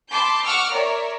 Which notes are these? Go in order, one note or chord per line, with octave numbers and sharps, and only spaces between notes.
A5 B5 C6 D6 G6
F#5 C#6 D6 E6 F6
A#4 C#5 D5 E5